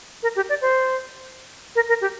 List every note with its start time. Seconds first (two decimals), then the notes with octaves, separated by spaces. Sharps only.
0.23 A#4
0.36 G4
0.49 D5
0.61 C5
1.76 A#4
1.89 A#4
2.01 G4